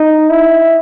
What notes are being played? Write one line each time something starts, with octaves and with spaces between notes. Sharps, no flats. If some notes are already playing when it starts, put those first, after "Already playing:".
Already playing: D#4
E4